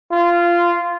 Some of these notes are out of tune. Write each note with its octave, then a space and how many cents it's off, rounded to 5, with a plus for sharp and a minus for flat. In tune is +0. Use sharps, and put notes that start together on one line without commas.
F4 -15